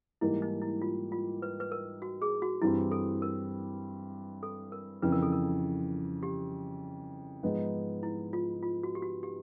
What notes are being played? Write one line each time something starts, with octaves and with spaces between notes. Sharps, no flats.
G#2 E3 G3 A#3 E4
D#4
E4
F4
F4
B4
B4
A#4
F#4
G#4
F#4
G2 E3 G3 C4 E4
A4
A#4
A4
A#4
F2 C#3 E3 B4
A#4
A4
A#4
G4
G#2 F3 G#3 B3 D#4
E4
F4
F4
F#4
G4
F#4
G4